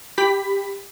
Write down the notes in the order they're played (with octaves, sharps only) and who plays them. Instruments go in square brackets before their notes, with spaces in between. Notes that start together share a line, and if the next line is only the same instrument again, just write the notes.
[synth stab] G4 B5 B6